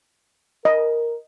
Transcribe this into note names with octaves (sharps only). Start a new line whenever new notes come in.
A#4 D#5